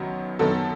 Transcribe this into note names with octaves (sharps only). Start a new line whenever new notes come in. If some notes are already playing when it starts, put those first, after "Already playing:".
Already playing: F#2 D#3 F#3 B3
F#2 D#3 F#3 B3 A4